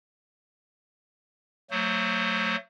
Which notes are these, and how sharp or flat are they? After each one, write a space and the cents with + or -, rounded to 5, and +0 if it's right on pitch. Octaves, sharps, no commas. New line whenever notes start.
F#3 +0 A3 +35 C5 +20